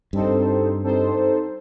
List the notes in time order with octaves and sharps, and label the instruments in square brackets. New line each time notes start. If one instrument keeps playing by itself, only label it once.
[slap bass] G2 [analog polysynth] G3 C4 D#4 A4 C5
[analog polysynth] G3 C4 D#4 A4 C5